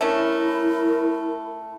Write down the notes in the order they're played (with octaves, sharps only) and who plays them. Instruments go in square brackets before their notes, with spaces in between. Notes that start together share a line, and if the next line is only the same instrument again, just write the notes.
[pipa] A3 C#4 D4 [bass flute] E4 [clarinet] A#4